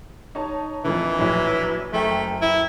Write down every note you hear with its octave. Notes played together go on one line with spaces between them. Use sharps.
D#4 C#5 A5
F2 A#2 D3 E3
A#1 A2 F#3
F#1 A3 G5
E4